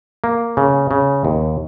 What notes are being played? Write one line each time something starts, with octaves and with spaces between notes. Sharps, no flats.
A#3
C#3
C#3
D#2